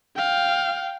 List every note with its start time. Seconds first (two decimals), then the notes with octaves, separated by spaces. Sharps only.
0.16 F5 G5